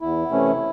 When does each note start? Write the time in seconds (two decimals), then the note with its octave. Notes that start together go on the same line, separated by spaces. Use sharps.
0.01 E2 E4
0.29 C3 E3 A3 C#4